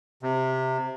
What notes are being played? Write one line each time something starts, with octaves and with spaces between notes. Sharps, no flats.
C3